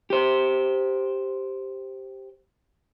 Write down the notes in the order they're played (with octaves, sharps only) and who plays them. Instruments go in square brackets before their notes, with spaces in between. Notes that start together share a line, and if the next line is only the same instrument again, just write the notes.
[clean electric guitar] G4 C5